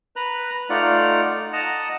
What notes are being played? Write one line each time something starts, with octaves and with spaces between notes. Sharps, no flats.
B4 A#5 F#6
A3 D#4 F4 D5 F#5 F6
D#5 F#5 A5 A#5